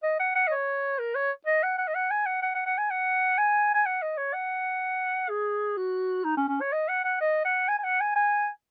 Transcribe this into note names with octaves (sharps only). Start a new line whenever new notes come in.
D#5
F#5
F#5
D#5
C#5
A#4
C#5
D#5
F#5
F#5
D#5
F#5
G#5
F#5
F#5
F#5
F#5
G#5
F#5
G#5
G#5
F#5
D#5
C#5
F#5
G#4
F#4
D#4
C#4
C#4
C#5
D#5
F#5
F#5
D#5
F#5
G#5
G#5
F#5
G#5
G#5